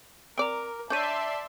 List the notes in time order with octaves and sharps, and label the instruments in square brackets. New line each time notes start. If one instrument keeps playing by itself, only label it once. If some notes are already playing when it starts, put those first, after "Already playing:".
[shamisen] C4 D5 [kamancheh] A#4 [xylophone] A#5 D6 D7
[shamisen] D4 C#5 [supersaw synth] D5 E5 C6 [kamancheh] A5 [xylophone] G6 D#7